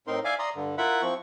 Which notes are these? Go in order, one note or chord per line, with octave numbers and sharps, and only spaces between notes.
A2 C4 D#4 A#4 C6
D5 E5 F5 G#5 D6
D5 A#5 C6 D#6
G2 D3
E4 F4 A#4 E5 F#5 B5
F3 C4 C#6